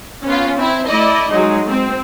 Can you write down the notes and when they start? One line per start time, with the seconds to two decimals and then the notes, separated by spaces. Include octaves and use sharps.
0.25 B3 C#4 F4
0.56 C4 E4
0.87 A3 E4 D5 D#5
1.29 F#3 G#3 D#4
1.68 C4